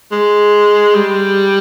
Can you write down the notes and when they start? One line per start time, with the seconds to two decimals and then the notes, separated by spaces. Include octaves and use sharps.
0.12 G#3
0.95 G3